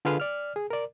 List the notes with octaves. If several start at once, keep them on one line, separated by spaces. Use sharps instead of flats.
D3 F4 G#4 B4 F5
D5 F6
G#4
A#4 D5